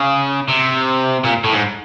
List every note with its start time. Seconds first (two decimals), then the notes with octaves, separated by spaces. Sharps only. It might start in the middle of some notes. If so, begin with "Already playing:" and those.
Already playing: C#3
0.49 C3
1.24 A#2
1.44 A2
1.53 G#2